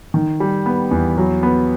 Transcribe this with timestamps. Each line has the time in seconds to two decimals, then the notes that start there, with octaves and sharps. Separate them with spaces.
0.14 D#3
0.40 G3
0.66 B3
0.91 E2
1.18 F#3
1.43 B3